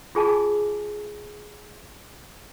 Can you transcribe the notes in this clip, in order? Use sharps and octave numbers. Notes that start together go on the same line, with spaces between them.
F4 G#4 G#5 A5 D6